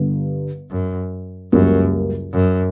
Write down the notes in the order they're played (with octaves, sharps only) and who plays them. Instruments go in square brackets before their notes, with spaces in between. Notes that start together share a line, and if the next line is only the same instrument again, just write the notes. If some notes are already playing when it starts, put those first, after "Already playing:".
Already playing: [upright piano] G1 G2 D3
[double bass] F#2
[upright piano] C#2 C#3 G3 A#3 [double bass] F#2
[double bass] F#2